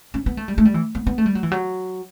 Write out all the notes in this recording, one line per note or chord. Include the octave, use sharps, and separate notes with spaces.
C#4
B3
A3
G3
A3
G3
E3
B3
B3
A3
G3
F#3
E3
F#3